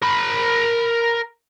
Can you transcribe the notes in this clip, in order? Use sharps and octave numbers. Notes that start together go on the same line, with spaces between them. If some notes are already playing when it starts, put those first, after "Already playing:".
A#4 B5